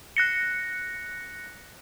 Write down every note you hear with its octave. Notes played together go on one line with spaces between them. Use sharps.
F#6 A#6 C#7